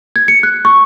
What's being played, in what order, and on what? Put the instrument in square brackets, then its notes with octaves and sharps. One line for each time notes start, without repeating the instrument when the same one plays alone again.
[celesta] G#6
C#7
F#6
C#6